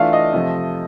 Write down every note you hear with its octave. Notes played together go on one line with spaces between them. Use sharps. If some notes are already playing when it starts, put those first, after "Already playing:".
Already playing: E3 A3 D4 F4 F5
D#5
C3 F3 A3